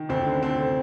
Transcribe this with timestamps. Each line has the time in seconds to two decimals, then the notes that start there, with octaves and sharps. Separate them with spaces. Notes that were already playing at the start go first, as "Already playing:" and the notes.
Already playing: D#3
0.09 D2 C4
0.26 D3
0.43 D3 C4